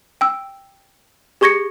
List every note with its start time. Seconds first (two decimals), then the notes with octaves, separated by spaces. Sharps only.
0.21 G5 E6
1.41 G4 G#4 C#6 G#6 A#6 C#7